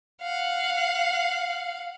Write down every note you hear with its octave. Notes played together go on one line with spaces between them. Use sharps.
F5 F#5